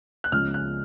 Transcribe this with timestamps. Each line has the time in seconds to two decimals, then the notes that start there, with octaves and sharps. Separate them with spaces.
0.24 F#6
0.32 C#2 C#3 F3 G#3 F6
0.54 F#6